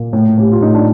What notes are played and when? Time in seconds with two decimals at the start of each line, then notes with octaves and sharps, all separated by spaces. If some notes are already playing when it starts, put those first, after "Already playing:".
Already playing: A#2 A#3
0.13 A2
0.38 A2 G4
0.52 F4
0.61 A2 D#4
0.74 D4